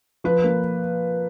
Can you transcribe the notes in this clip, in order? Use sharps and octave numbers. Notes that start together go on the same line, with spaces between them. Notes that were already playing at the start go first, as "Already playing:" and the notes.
F3 B4
A#3